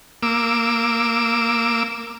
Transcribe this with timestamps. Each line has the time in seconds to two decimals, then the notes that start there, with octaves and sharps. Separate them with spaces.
0.23 A#3 D6 E6